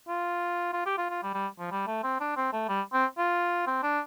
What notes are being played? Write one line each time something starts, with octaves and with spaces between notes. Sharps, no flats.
F4
F4
G4
F4
F4
G3
G3
F3
G3
A3
C4
D4
C4
A3
G3
C4
F4
C4
D4